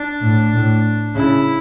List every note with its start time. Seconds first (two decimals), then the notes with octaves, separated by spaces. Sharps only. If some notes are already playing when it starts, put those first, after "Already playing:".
Already playing: D4
0.22 A2
0.53 A2
1.15 C#3 E4